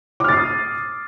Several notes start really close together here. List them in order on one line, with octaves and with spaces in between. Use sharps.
D6 F6 A6 C7 D#6